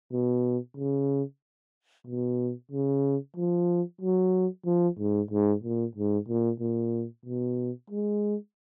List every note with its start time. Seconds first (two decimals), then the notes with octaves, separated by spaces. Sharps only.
0.12 B2
0.77 C#3
2.07 B2
2.71 C#3
3.36 F3
4.01 F#3
4.65 F3
4.99 G#2
5.31 G#2
5.63 A#2
5.95 G#2
6.28 A#2
6.60 A#2
7.25 B2
7.90 G#3